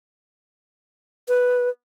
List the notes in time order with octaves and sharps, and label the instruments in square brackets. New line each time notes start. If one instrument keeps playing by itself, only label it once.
[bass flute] B4